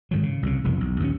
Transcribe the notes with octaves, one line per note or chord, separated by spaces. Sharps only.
G#2 D#3 F#3
C#3
C2 C#3
F1 B1 F2 E3
B1
D#2 A#2 D3 C#4